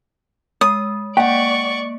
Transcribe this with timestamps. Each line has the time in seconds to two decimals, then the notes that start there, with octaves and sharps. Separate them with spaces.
0.61 G#3 D#6
1.17 A#3 D5 F#5 G5 C#6